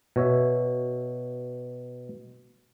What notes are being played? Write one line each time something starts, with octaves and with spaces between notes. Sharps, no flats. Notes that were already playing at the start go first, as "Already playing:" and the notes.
B2 C#5 E5